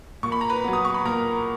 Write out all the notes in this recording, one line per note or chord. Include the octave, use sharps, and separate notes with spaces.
A#2 C#6
B5
A#5
B4 B5
F#3 B3
D#6
C#6
B5
A#2 A#4 A#5